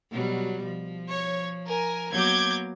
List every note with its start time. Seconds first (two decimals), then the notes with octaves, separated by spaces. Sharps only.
0.11 B2 F#3 G3
0.64 F3
1.09 C#5
1.67 A#4 G#5
2.11 F#3 A#3 B3 D6 G6 G#6